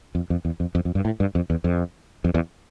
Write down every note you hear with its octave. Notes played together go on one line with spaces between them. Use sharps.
F2
F2
E2
F2
F2
F2
G2
A2
G2
F2
E2
F2
F2
E2